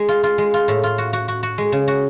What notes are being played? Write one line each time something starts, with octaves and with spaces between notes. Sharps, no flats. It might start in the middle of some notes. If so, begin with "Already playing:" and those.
Already playing: G#3
F4
F4
G#3
F4
A2
F4
F#4
F#4
F#4
F#4
G#3
C#3
F#4